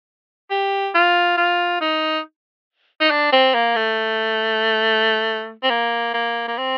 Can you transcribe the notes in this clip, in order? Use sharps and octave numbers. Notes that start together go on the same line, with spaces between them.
G4
F4
F4
D#4
D#4
D4
C4
A#3
A3
C4
A#3
A#3
A#3
C4